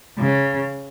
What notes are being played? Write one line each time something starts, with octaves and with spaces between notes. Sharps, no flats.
C#3